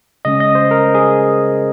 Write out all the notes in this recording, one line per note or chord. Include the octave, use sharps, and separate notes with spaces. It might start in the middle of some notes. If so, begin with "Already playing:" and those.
C#3 G#3 C#4 D#5
D#5
C5
A#4
G#4